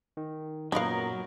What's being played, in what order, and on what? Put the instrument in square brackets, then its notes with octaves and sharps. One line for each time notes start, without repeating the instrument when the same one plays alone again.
[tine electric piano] D#3
[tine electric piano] F#2 A#2 [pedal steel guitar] F#3 A#4 [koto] B3 D#4 [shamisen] F5 B5